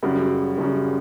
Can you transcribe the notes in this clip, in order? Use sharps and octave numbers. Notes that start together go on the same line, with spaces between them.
F#2 C#3 G3 F#4
F#2 C#3 G3